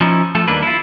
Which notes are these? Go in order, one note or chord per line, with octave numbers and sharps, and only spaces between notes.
F3 C#4 D#4 E4
F3 A3 A4
D#2 G3 A#3 D4 B4
E4 F4